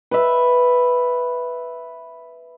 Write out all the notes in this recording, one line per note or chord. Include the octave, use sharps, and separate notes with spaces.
B4 E5